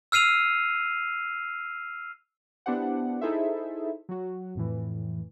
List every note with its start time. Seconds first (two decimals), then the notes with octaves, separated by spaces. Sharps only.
0.12 E6 F6 C7 D#7 F7
2.66 B3 D4 E4 G4 C5 F#5
3.21 D#4 E4 G#4 A4 C5 E5
4.09 F#3 F#4
4.55 F2 A2 E3